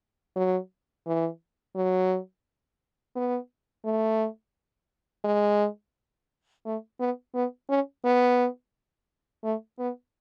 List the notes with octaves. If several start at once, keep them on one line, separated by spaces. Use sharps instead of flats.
F#3
E3
F#3
B3
A3
G#3
A3
B3
B3
C#4
B3
A3
B3